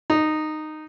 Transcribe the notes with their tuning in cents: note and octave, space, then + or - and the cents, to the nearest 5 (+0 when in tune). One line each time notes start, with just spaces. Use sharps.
D#4 -10